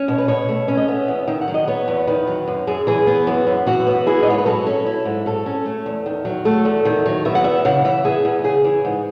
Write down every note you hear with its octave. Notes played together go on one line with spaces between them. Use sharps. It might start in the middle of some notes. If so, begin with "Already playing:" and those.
Already playing: C#4
B2 C#5
B4
B2 C#5
A3
C#4
D#5
B3 E5
E2
D#3 E5
F#5
F#3
D#5
B3 C#5
E2
D#3 B4
F#3
F#2
F#2 G#4
E3 G#4
B3
F#2 F#4
F#2
E3 F#4
B3
E4 G#4
D#5
G#2 C#5
B4
F#3 A4
C#4
E4
G#2
F#3 A4
C#4
A3
E2
D#3
F#3
A3 A4
E2
D#3
F#3
B3 E5
F#5
E2 E5
C#3 F#5
E3 E5
B3 G#4
E2
C#3 G#4
E3
G#2